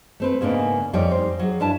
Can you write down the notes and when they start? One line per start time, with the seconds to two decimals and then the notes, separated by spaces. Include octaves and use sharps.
0.20 A3 C4 B4
0.41 G#2 C#3 A#3 B3 D4
0.93 F2 G3 D#4 C#5 D5 G5
1.11 C5
1.39 F#3 G#4
1.60 G2 D4 E4 A5